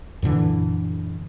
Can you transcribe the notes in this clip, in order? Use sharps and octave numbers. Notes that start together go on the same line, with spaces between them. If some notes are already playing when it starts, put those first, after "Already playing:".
F#2 A#2 D3 E3